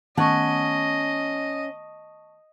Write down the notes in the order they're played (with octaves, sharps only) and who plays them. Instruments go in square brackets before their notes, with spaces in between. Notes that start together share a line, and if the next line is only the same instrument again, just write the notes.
[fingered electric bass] D#3 A3 B3 [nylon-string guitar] C#4 F#5 [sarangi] D#5 [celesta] A5 C#6